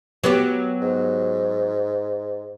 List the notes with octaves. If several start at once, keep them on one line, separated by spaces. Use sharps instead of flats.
F#3 B3 G4
G#2